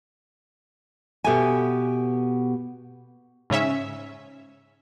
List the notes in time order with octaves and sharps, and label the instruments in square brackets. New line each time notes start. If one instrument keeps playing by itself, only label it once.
[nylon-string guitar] B2 B3 G4 A4 E5 G#5
[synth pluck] G#2 C#3 C#4 E5